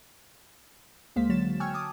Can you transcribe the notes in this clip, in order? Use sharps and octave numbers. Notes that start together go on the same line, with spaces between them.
C#2 G#3 A#3 C5 F5 B6
D3 F#3 F#4 C#5 A6 E7
G5 G#5 C#6 E6 F6 G#6
A5 D6 D#6